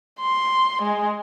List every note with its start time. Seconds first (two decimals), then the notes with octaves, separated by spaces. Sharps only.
0.21 C6
0.83 G#3